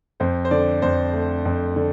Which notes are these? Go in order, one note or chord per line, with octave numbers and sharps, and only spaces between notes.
F2 C5
C5
D3 D5
F2 C5
A3
F2
D3